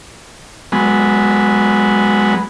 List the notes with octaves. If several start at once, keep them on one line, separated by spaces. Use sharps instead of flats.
F#3 G#3 B3